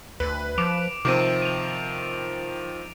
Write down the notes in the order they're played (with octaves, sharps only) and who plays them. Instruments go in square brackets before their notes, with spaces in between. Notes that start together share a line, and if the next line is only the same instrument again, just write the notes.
[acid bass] D2 [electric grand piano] B4
[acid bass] F3 [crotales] D6 D7 F7
[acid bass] C3 [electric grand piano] D#3 F3 C4 [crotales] D6 D7 D#7
[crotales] D#7 F7